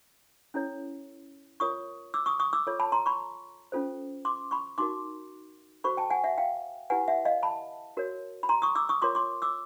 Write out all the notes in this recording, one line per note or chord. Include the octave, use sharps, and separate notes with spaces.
C#4 E4 A4 C#5
F4 A#4 C#5 C#6 D#6
D6 E6
C#6 D#6
C#6 D#6
D6 E6
F4 A4 C#5
A5 B5
A#5 C6
B5 C#6
C#4 F4 A4 C5
C6 D6
B5 C#6
D#4 F#4 A#4 C6 D6
F#4 A4 C5 B5 C#6
G5 A5
F#5 G#5
E5 F#5
F5 G5
E4 G4 B4 F#5 G#5
E5 F#5
D#5 F5
A5 B5
F#4 A#4 C#5
B5
A#5 C6
C#6 D#6
D6 E6
C#6 D#6
F4 A#4 C#5 C6 D6
C6 D6
D6 E6